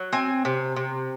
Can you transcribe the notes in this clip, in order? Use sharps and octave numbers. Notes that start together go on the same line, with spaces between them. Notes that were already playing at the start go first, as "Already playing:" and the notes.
Already playing: F#3
C4 G#5
C3
C3